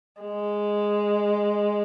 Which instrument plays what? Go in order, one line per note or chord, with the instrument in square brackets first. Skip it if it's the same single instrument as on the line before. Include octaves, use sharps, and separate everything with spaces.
[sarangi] G#3